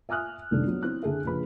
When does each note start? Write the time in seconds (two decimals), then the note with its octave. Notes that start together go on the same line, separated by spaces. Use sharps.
0.09 E5 G#5 D#6 F6 F#6
0.51 F1 C2 D#3 D4 A4 D5
0.65 F#3 B3
0.83 C4 E4 F#6
1.03 D3 D4 G#4 A4 E5
1.24 A#1 C#3 F3 B4 B5